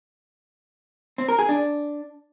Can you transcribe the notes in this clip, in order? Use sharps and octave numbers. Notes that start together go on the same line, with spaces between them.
C4
A#4
G#4
D4